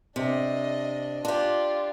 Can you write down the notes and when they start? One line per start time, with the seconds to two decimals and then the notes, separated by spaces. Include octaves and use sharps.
0.16 C3 D4 D#5
1.25 D4 F4 G4